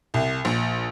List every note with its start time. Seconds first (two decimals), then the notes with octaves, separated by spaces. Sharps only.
0.14 C2
0.45 A#1